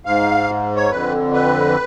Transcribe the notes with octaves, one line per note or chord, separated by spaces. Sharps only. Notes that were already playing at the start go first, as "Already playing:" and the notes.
G#2 F5
C#5
F2 D3 B4
B4